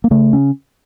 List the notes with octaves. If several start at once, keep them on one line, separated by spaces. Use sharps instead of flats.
A#3
C#3 A3
C#4